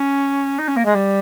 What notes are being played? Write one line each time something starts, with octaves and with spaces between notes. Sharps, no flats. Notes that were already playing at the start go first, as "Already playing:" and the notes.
Already playing: C#4
D#4
C#4
A#3
G#3
G3